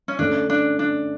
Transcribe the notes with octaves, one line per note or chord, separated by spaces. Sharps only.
C#4
D3 A3 C#4 D4
D4
D4